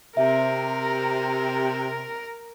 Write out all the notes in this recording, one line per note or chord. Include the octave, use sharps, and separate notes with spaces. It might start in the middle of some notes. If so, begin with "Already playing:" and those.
C3 A#4 E5